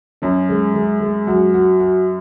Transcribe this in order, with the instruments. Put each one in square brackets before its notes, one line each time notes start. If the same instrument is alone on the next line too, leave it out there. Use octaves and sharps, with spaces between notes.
[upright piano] F#2 [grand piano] C#4
[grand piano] G#3
G#3
G#3
[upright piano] F#2 [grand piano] F#4
[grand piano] F#4
F#4